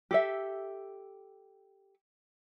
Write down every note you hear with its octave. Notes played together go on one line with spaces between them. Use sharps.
G4 A4 E5